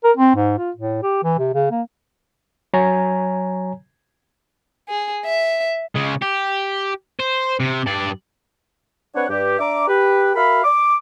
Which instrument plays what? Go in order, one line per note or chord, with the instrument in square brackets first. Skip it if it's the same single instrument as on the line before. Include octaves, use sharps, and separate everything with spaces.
[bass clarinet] A#4
C4
G#2
F4
A2
G4
E3
C3
C#3
A#3
[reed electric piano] F#3 C#5 G#5 A#5
[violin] G#4
E5
[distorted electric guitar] C#3 G#3
G4
C5
C3
G2 D5
[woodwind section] C4 D4 B4 C#5 F#5
G2 G4
D4 E5 A#5 D6
G4 B4
F#4 A#4 E5 F5 B5
D6